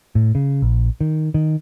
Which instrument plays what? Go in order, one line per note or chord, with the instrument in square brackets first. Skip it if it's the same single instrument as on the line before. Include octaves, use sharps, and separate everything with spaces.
[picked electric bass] A2
C#3
A#1
D#3
D#3